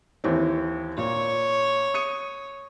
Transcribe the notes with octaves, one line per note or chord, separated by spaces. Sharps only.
D#2 E3 C4
A#2 C#5
D#6 C#7 D#7